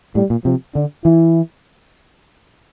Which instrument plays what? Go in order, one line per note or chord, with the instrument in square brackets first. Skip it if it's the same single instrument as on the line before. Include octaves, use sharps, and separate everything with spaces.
[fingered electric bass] A2 [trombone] G3
[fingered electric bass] A#2
[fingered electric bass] C3 [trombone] F3
[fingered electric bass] D3 [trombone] D4
[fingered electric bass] E3 [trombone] E4